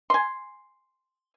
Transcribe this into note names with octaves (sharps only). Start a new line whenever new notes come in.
G#5 C6